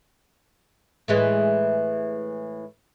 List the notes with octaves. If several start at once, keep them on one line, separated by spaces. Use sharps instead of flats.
A2 E3 G#3